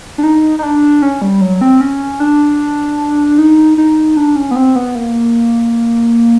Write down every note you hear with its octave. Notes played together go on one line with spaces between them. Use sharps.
D4
D#4
D#4
D4
C#4
G3
F#3
C4
C#4
D4
D#4
D#4
D4
C#4
B3
C4
B3
A#3